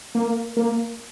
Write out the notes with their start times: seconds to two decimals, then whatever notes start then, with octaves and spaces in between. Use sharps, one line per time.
0.15 A#3
0.57 A#3